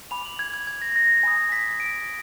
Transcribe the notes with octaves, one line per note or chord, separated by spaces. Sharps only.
G#5 B5 D6 F7
F#7
G#6
G#6
G#6
A#6
A#6
G#5 B5 D#6
B6
D7